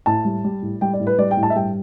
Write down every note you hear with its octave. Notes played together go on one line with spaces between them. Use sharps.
A2 A5
G3
G3
A2
G3 G5
D5
A2
B4
G3 D5
G5
A2
A5
E5
G2 G5